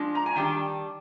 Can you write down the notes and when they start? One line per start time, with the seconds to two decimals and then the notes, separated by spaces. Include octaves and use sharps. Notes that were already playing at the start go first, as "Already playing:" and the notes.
Already playing: F3 G#3 D4
0.15 A#5
0.26 G#5
0.36 D#3 G3 D4 G5